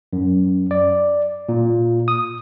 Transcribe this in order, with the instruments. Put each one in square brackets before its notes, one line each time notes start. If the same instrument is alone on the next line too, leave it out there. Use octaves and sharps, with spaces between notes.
[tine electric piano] F#2
D5
A#2
D#6